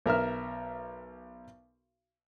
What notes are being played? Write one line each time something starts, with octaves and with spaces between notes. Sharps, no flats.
B1 A#4 E5 F6